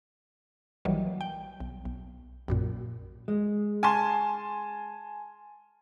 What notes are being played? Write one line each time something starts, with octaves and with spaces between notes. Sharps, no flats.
A#1 D#3 E3 F#3 G3
G5
B1
B1
A#1 F#2 A#2
G#3
G#5 A5 C6